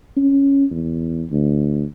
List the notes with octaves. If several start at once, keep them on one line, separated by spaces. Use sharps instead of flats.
C#4
E2
D2